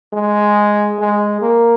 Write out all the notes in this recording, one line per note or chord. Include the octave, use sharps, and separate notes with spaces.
G#3
G#3
A#3